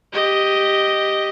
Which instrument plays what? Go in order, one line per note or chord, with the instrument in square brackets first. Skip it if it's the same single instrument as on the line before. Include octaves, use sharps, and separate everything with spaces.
[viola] G4 D#5